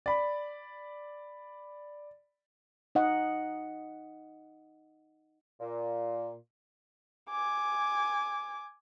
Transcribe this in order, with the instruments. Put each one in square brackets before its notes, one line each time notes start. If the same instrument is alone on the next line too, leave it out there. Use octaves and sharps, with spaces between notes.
[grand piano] D5 B5
[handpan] D#4 D#5 F#5
[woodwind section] A#2
[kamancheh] G#5 D6